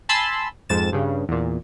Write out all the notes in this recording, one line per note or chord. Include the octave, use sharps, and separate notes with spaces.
G#5 A5 B5 C6 E6
F2 G#2 A6 E7
G2 C#3
E2 A#2